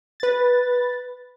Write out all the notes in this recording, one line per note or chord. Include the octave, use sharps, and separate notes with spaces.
B4 A6